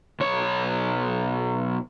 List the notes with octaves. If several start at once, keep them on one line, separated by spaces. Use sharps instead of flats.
B1 C#5